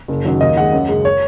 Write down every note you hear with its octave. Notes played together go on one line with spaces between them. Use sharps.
F#1
F#2 D#3 F#3
D#2 D#5
D#3 G#3 F#5
F#2
C#3 G#3
C#5